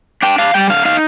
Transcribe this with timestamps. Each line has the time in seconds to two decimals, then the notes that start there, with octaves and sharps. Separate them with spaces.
0.22 D4 G5
0.38 D4 F5
0.54 G3 G5
0.70 D3 F5
0.85 D#4 F5